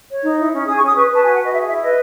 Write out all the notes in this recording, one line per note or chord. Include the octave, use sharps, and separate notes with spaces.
C#5
D#4
E4
C#4
G#4 D#6
C#6
C#4
D#6
B4 C#6
B4 A5
F#4 G#5
F#5
F#4 D#5
G#4 E5
E4 E5
B4 D#5